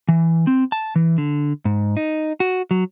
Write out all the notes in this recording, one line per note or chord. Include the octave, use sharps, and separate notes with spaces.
E3
C4
A5
E3
D3
G#2
D#4
F#4
F#3